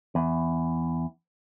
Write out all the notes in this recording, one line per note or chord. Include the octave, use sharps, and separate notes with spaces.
E2